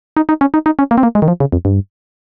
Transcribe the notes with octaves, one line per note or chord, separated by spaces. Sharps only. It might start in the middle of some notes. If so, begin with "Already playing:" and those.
D#4
D#4
C#4
D#4
D#4
C#4
A#3
C4
A#3
G#3
D#3
F3
C#3
F2
G2